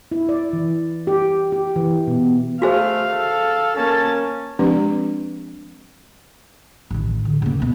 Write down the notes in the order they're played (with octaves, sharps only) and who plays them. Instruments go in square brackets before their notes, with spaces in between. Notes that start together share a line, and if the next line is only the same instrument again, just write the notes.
[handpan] E4
D5
E3
G4
G4
E3
B2
[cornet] A3 [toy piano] F#4 G#4 C5 [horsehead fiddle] F5
[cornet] A4
[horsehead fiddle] A#3 A5 [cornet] C#4
[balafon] F3 G#3 C4 D4 G4 B4
[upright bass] A1 D#3
D3
C#3 A#3
C#2 B2